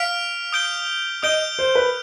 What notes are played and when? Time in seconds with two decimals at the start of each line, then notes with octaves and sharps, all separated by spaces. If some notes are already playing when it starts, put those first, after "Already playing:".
Already playing: F5 F6 B6 D7 F7
0.53 D#6 G6 D7 G7
1.23 D#5 D#6 G6 D7 G7
1.59 C5
1.75 B4